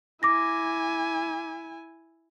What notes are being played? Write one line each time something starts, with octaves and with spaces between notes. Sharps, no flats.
E4 G#5 D6 A#6